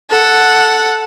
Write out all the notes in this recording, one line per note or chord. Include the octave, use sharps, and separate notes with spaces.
A4 F#5